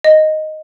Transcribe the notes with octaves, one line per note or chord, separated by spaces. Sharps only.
D#5